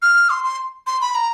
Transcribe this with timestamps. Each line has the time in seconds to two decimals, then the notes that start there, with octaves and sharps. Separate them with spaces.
0.02 F6
0.30 C6
0.44 C6
0.87 C6
1.01 B5
1.15 A#5